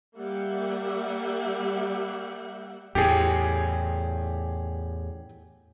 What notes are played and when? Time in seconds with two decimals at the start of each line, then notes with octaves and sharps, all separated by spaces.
0.16 G3 A#3 G4 E5 F#5
2.95 E2 A2 G4 G#4